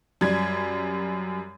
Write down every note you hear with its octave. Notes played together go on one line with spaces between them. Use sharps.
F#2 G3 G#6